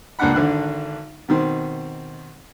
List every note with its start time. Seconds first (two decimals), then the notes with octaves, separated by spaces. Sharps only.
0.19 C#2 G2 A#3 D4 F#5 B5
0.34 G#1 D3 D4 F#6
1.29 B2 D#3 C4